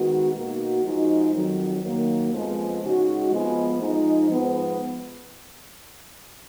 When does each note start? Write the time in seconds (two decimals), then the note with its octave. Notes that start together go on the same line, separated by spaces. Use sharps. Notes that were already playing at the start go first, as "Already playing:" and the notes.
Already playing: D#3 G#3 B3 F#4
0.32 B2 A#3 D#4 F#4
0.82 F3 G#3 D#4 F#4
1.32 F2 D#3 F#3
1.82 D#3 F#3 A#3
2.31 F2 F3 G#3 B3
2.81 C#3 G#3 D#4 F#4
3.30 F3 G#3 B3
3.80 F3 G#3 D#4
4.30 G#2 F3 B3